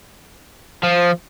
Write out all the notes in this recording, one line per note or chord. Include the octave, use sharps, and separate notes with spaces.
F3